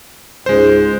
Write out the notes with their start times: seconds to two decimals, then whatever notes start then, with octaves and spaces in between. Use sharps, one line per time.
0.46 C#2 G#2 G#3 C5